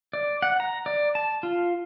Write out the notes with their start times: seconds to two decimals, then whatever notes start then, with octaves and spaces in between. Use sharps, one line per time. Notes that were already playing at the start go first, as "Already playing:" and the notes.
0.13 D5
0.42 F#5
0.60 A#5
0.86 D5
1.15 A5
1.43 F4